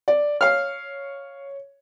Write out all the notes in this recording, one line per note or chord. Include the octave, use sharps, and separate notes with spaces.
D5
C#5 F5 F6